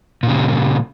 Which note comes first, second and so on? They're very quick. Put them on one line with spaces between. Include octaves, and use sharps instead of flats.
A#2 C#3 G3